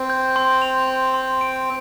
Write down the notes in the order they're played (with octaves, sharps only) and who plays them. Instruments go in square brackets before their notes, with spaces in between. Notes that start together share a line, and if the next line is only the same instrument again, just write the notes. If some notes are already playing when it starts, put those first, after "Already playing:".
Already playing: [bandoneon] C4
[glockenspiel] G6
C6
F7
C6
C6
D7